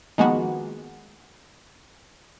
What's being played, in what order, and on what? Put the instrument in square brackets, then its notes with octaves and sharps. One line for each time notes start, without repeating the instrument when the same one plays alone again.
[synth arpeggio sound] D#3 F3 G#3 A#3 B3 F#4